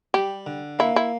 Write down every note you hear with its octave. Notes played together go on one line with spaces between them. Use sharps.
G3 G4
D3
A#3 E4
E4